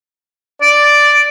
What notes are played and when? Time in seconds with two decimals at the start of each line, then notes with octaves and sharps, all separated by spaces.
0.62 D5